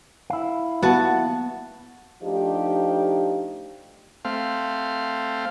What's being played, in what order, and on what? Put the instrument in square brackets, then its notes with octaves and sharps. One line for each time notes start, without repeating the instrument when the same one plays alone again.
[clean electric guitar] E4 F5
[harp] B3 [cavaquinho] F#4 A5
[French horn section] F3 A3 D4 D#4 G4
[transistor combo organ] A3 C4 F5